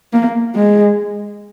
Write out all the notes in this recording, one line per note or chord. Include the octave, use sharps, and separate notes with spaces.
A#3
G#3